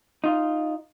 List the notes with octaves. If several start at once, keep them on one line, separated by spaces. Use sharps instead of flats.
D#4 F4